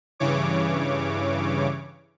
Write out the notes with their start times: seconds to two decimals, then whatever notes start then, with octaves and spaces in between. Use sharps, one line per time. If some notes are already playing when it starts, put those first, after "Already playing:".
0.20 G2 C#3 E3 C#5 D6